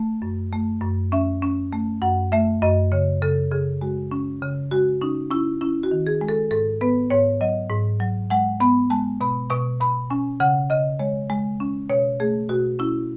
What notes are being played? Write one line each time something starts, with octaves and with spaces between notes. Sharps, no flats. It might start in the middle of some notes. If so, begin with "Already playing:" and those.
Already playing: A3
F#2
A3
F#2
C#4 E5
C#4
A3
F#2 F#5
A3 E5
F#2 D#5
C#3 C#5
C#3 A4
C#3 G#4
G#3 F#4
C#4
C#3
G#3 F#4
C#4 D#4
C#4 E4
C#4 E4
F#4
D#3
G#4
G#3
A4
G#2 A4
B3 B4
G#2 C#5
F#3 D#5
G#2
F#3
G#3 F#5
B3 B5
G#3 A5
B2 B5
B2 C#6
B2 B5
C#4 G#5
C#3 F#5
C#3 D#5
G#3 C#5
G#3
C#4
B2 C#5
A3 G#4
B2 F#4
C#4 E4